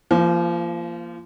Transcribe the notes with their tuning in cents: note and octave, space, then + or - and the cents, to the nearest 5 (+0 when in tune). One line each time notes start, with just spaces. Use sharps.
F3 -30 A#3 +0